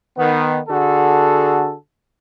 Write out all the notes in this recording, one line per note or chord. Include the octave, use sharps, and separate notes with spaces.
D#3 B3
D3 F#4 G#4 A4